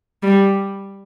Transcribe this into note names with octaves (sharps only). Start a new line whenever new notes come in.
G3